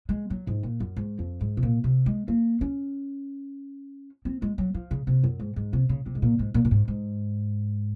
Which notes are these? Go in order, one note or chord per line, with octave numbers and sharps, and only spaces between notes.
G#3
F#3
G#2
A#2
F#2
G#2
F2
G#2
C3
A#2
C3
G#3
A#3
C#4
C4
G#3
F#3
F3
C#3
C3
F#2
G#2
G#2
C3
C#3
C3
G#2
A#2
G#2
A#2
A#2
G#2
G#2